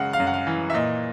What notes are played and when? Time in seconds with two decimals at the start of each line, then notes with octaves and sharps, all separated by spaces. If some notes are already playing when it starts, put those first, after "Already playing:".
Already playing: F#2 C#3 G#3 F5 F#5
0.13 F5
0.20 F#2
0.27 F#5
0.34 F5
0.47 E3
0.70 E5
0.74 A#2 D#5